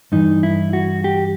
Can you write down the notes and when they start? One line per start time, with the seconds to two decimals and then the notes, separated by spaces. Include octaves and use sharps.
0.12 G2 E3 D#4
0.43 E4
0.73 F#4
1.04 G4